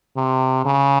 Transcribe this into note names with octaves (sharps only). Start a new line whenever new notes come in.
C3
C#3